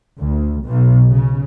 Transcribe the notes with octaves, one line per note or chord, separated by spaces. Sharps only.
D2
B1
C#3